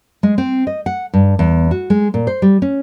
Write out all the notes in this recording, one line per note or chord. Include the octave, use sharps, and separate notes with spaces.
G#3
C4
D#5
F#5
G2
E2
F#4
G#3
A#2
C5
G3
C#4